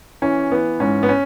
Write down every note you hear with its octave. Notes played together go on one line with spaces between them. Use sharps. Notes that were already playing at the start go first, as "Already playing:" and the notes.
E3 C#4
E3 B3
G#2 C#4
B3
C#4